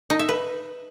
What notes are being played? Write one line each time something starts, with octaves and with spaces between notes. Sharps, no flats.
D#4
E5
B4